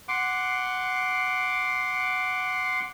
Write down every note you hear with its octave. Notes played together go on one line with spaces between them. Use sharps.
F#5 C6 D6